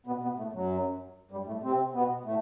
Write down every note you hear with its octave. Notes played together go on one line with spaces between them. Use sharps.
B2 B3
B2 B3
A2 A3
F#2 F#3
G2 G3
A2 A3
C3 C4
B2 B3
A2 A3